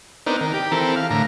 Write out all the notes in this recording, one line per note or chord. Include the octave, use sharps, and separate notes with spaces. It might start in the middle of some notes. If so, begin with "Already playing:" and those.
B3 C4 D4 D#4 A#4
D#3 A#4
G4
E3 C4 A4 A#4
F5
A2 D3 A#5